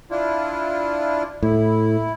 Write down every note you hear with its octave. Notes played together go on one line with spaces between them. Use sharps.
D4 E4 F4
A2 E4